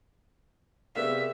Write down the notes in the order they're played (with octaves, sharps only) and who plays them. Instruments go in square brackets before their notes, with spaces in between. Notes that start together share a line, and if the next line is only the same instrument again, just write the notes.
[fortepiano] C3 B3 F5 [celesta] G#4 A#4 D5 [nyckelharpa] E5